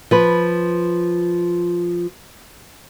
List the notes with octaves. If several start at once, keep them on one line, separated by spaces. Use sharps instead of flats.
F3 B4